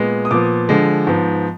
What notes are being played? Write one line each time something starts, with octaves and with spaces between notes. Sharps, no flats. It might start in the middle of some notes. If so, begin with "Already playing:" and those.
Already playing: A#2 G#3 B3
D#6
A#2 F3 B3 D6
D3 F3 G#3
G#2 F3 B3